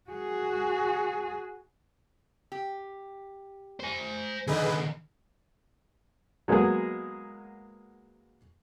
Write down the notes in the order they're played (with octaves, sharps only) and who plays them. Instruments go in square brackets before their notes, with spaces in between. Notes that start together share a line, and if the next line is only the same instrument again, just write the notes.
[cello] F#4 G#4
[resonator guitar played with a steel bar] G4
[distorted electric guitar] C5 G#5
[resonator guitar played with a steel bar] D3 D#4 [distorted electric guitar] D#3 D4 [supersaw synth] G#4 B4
[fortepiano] F#3 G#3 A#3 B3 G#4